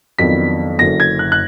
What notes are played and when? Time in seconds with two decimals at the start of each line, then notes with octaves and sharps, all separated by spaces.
0.19 F2 D#3 F#3 B3 D4 B6
0.79 F#1 F#2 D3 A#6
1.00 G#6
1.19 F#6
1.32 F#6